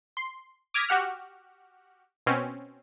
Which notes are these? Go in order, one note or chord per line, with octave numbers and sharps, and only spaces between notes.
C6
D6 D#6 F6 G#6 A#6 B6
F#4 G4 F#5 F6
B2 C4 C#4